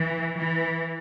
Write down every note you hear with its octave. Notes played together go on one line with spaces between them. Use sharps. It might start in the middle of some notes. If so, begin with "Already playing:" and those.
Already playing: E3
E3